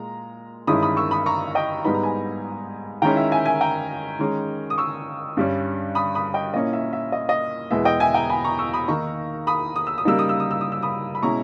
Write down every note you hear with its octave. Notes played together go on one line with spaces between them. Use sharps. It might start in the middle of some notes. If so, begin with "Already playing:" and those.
Already playing: A#2 G#3 A#5
G2 D#3 G#3 C#4 E4 B5 D#6
B5 D#6
C#6 E6
B5 D#6
A#5 C#6
D#5 G5
G#2 G3 B3 D#4 B5
A#5
G#5 B5
D#3 G#3 C#4 E4 G5 A#5
E5
E5 G#5
E5 G#5
G5 A#5
D#3 G#3 C#4
D#6
C#6 E6
G2 G3 C#4
B5 D#6
B5 D#6
D#5 G5
A#2 A#3 C#4 E4 D#5
E5
E5
D#5
D#5
E2 B2 G#3 B3 E4 E5
D#5 G5
E5 G#5
G5 A#5
G#5 B5
A#5 C#6
C#6 E6
B5 D#6
D#3 A#3 D#4 A#5 C#6
B5 D#6
D#6
E6
D#6
C#3 G3 A#3 D#4 E6
D#6
E6
D#6
E6
D#6
E6
B5 D#6
B5
B2 G#3 C#4 E4 A#5 C#6